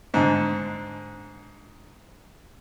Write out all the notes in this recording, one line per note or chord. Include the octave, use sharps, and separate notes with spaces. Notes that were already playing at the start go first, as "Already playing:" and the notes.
G#2 D3